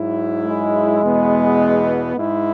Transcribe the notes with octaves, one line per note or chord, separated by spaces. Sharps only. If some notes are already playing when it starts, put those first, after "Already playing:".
Already playing: G#2 F#3 E4
G#3
E2 B2 B3
G#2 G#3 E4